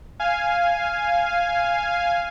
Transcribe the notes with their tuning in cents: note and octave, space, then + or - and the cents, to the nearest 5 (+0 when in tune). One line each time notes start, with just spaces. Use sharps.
F5 -5 G#5 +0